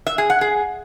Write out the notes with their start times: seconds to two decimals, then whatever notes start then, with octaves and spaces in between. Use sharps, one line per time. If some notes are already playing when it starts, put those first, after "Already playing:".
0.07 E5
0.18 G#4
0.30 F#5
0.41 G#4